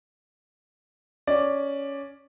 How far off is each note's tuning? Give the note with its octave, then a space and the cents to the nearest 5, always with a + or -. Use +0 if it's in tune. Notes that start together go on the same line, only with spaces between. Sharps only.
C#4 +10 D5 +5